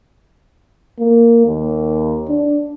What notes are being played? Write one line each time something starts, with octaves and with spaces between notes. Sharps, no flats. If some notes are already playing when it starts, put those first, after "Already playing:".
A#3
D#2
D4